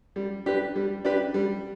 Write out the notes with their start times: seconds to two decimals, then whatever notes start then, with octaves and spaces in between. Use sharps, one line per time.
0.16 G3
0.46 D4 G4 B4
0.76 G3
1.05 D4 G4 B4
1.34 G3